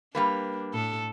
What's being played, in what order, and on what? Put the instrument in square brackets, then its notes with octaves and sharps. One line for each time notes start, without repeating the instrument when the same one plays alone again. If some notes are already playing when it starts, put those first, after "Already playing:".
[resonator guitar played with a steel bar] G3 A#3 B4 [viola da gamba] D4
[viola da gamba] A2 A4